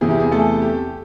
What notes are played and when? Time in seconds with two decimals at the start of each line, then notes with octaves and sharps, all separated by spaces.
0.01 E2 C3 E3 G#4
0.10 G4
0.20 G#4
0.31 A3 A4
0.62 G4